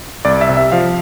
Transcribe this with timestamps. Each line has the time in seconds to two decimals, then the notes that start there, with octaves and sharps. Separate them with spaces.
0.25 C2 D5
0.41 E5
0.49 C3
0.57 E5
0.72 F3 F5